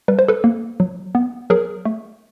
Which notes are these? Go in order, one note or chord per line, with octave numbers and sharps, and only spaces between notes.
G3 B4
C5
A4 B4
A#3
F#3
B3
F#3 G#4 A#4
A3